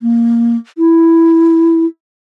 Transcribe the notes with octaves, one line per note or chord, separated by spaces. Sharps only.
A#3
E4